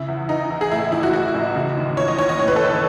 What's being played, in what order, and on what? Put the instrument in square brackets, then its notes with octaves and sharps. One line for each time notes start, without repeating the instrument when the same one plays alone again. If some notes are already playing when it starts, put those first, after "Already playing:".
Already playing: [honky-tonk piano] C#3 E4
E2
E3 D#4
E2
G#4
A2 E4
A1 E4
F#4
E3 F#4
A1
C#3
D#2
E3 C#5
D#5
D#2 C#5
D#5
A2 C#5
B4
A4
A1 B4